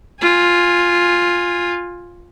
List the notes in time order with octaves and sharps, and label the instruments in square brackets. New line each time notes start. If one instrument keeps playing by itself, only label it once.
[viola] F4 G#5